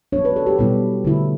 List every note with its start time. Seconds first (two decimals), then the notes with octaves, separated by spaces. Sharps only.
0.12 D4 C#5
0.16 F#3 B3
0.25 B4
0.36 A4
0.47 G4
0.58 B2 G3 B3 E4 G4
1.04 D3 A3 E4